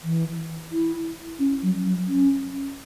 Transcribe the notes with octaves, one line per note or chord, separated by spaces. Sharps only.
E3
E4
C#4
F#3
F#3
C#4